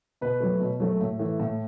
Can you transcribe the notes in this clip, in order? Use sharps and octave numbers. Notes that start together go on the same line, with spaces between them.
B2 B4
F#3 A3
B2
F#3 A3
A2
E3 A3
A2